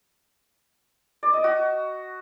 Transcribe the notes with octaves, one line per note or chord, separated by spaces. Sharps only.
D5
D#5
F#4